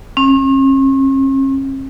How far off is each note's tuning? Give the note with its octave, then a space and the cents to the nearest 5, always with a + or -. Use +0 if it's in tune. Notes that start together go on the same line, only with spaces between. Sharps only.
C#4 -45